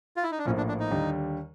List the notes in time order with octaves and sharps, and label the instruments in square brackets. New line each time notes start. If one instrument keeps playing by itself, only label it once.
[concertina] F4
E4
D#4
D4
[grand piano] A#1 A2 F3 A#3 [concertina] C#4
[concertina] D4
D4
D#4
[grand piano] D#2 D3 G3